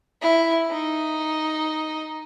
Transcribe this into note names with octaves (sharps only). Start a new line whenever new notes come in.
E4
D#4